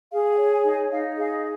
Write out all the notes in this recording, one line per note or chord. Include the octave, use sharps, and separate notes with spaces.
G#4 F5
G5
C#5
G#5
D#4
G#5
D#4 F5
G#4 F5